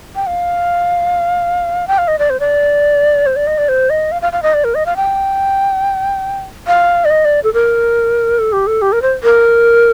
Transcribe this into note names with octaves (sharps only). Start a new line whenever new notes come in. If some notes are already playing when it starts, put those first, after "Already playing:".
G5
F5
G5
F5
D#5
D5
C5
D5
C5
D5
D#5
D5
C5
D#5
F5
F5
F5
D#5
D5
A#4
D#5
F5
G5
F5
D5
D#5
D5
A4
A#4
A4
G4
A4
G4
A#4
C5
A#4